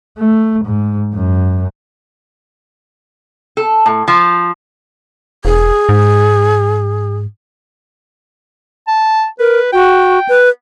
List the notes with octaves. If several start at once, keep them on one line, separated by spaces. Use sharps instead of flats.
A3
G#2
F#2
A4
A2
F3
E1 G#4
G#2
A5
A#4 B4
F#4 G5
B4